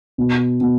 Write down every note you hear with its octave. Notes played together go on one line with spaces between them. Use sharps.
B2
B2